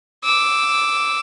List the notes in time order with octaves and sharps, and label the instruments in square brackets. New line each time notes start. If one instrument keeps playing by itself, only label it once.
[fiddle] D6 E6